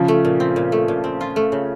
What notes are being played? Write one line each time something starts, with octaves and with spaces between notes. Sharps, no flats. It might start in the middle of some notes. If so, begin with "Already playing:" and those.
Already playing: C#3 F3
A3
A#2
C4
A#2
A3
A#2
C4
F4
A3
C#3